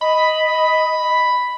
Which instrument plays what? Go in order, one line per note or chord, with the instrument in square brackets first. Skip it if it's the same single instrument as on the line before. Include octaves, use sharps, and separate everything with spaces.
[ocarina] D#5 [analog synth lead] B5